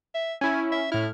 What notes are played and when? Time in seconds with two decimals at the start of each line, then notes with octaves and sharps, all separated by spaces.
0.14 E5
0.41 C#4 E4 G#5
0.72 E5
0.92 A2 E4 F6